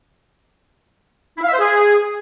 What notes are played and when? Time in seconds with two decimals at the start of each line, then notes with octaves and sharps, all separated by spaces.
1.38 E4
1.43 F5
1.48 E5
1.54 C5
1.59 G#4